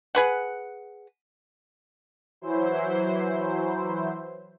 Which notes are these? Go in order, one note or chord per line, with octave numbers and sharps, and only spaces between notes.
G#4 B4 F#5
E3 F#3 E4 C5